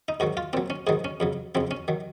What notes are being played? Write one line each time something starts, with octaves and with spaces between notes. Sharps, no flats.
D#4
G#2 D#3 F#3 F#4
F4
A#2 F#3 C4
C#4
G#2 D#3 F#3 G#4
C#4
F2 C#3 F#3
F2 C#3 F#3 C4
C#4
D#3 F#3